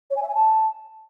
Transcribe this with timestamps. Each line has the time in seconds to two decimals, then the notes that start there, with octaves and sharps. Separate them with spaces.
0.10 C#5
0.16 G#5
0.22 E5
0.28 G#5
0.34 A5